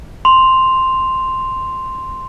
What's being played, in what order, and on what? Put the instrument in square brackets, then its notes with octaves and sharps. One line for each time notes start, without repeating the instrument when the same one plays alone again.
[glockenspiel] C6 F7